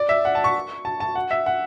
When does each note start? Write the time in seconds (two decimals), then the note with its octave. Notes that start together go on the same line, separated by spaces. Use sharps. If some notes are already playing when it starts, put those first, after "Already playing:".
Already playing: D5
0.09 E5
0.25 F#5
0.35 A5
0.44 C#6
0.85 A5
1.00 A5
1.15 F#5
1.31 E5
1.46 F#5